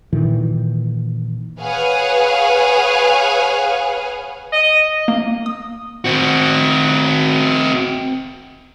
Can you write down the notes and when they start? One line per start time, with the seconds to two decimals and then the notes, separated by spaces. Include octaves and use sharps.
0.13 A#2 D#3 E3
1.61 G#4 B4 C#5 F5 F#5 G#5
4.53 D#5
5.08 A#3
5.46 D#6
6.05 C4 F#4